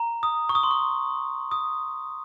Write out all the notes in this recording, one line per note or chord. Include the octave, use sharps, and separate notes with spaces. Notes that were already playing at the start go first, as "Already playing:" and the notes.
Already playing: A#5
D#6
C#6
D#6
C6
C#6
D#6